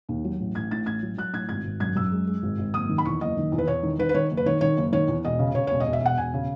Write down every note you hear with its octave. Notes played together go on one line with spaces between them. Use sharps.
D#2
F#3
A1
A1 G#6
A2 A6
A1 G#6
F#3
F#3 F#6
A2 G#6
G#1 G#6
G#1
F#2 G#6
F#2 E6
G#3
G#3
G#1
G#1
F#1 D#6
D#3
B5
E2 C#6
F#1 D#5
D#3
E2
B4
E2 C#5
D#3
D#3 B4
B4
D#3 C#5
F#1
B4
D#3 C#5
D#3 C#5
F#1
D#3 C#5
E2
E1 D#5
C#3
C#3 C#5
E1 C#5
D#5
E1
E5
E1 F#5
E1 G#5
C#3